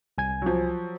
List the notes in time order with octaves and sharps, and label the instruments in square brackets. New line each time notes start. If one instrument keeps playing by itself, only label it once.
[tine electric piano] C2 G#5 G#6
[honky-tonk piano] F3 F#3